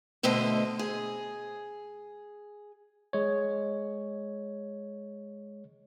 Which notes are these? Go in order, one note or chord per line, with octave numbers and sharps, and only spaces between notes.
B2 D3 A3 C5 D#5
G#4
G#3 C#5